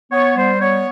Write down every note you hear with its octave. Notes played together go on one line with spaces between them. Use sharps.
B3 C#5
G3 C5
B3 C#5